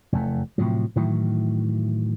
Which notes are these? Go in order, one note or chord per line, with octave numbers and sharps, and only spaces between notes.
F1 E2 A3
A2 C3 F3 F#3
A2 D#3 E3 F#3